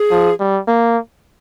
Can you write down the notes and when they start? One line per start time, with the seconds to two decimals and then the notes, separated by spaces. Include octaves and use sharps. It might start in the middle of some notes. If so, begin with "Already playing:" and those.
Already playing: G#4
0.11 F3
0.40 G3
0.68 A#3